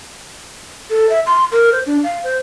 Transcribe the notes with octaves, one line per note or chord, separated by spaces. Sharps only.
A4
E5
C6
A#4
C5
D4
F5
C5